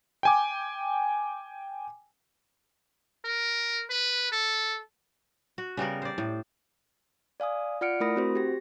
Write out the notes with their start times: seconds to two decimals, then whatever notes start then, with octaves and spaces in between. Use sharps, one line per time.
0.23 G5 G#5 D6
3.25 A#4
3.90 B4
4.32 A4
5.58 F#4
5.77 C#3 G3 B3 A#4
6.02 C5 D5
6.18 A2
7.40 D5 F5 G#5 D#6
7.81 F4 D5 F#5 F6 C#7 D7
8.00 A3 E4 A#4 B5 D#6 A#6
8.16 C4 F#4 C5
8.35 G4 A#6